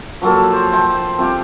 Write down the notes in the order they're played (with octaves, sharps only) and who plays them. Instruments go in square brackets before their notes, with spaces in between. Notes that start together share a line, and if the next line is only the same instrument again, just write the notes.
[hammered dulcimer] F3 F#3 A#3 A4
C5
C5 G5 A5
C4 F4 G4